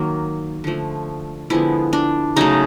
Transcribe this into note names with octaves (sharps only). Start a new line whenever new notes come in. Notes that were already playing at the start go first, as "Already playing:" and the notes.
Already playing: D#3 F#3 A#3
D3 F3 A3
D3 F3 G#3 B3 E4
D4
C#3 F#3 A3 D#4